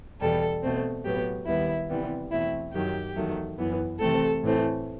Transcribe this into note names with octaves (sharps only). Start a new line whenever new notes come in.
E2 B2 G3 A4
B2 A3 C4
A2 F#3 B3 G4
D#2 D#3 G3 B3 E4
C3 E3 G3 B3
E2 B2 A3 C4 E4
F#2 D#3 F#3 G4
E2 D#3 F#3 A3
F#2 E3 B3
C3 E3 A3 C4 A4
A2 E3 A3 C4